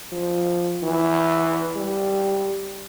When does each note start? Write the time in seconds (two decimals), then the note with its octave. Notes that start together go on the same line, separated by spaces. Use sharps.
0.12 F3
0.83 E3
1.76 G3